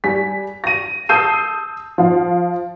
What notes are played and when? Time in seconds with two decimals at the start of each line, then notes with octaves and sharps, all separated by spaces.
0.04 G3 G#5 B6
0.64 A#6 D#7
1.09 A5 D#6 E6 G6 C7 D#7
1.98 F3 F5